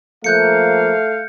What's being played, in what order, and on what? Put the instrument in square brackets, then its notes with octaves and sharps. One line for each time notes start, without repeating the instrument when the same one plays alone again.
[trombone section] F3 A#3 [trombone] A3 [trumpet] F5 [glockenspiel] F#6 G6 C#7